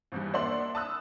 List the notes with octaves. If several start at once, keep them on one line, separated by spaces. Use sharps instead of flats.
G#1 E2 G2
A#3 D4 E5 F#5 C6 F#7
A5 B5 D#6 E6 F#6